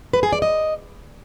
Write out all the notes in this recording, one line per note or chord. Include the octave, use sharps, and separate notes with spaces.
B4
G#4
D5
D#5